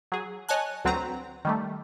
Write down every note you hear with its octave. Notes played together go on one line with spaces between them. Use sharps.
F#3 G#4
C#5 D#5 G#5 A5 F#6
D2 F#3 C4 B4 A#5
D#3 G3 A3